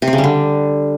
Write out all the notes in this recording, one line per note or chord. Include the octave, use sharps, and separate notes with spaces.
C3
C4
C#3
G3
D3